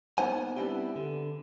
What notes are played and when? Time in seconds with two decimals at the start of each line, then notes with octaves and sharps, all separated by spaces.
0.18 A#3 B3 D#4 C5 F#5 G#5
0.56 G3 B3 C4 D4 E4 G4
0.96 D3